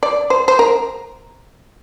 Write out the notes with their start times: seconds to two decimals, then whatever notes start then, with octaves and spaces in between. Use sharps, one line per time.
0.03 D5
0.30 C5
0.48 C5
0.59 A#4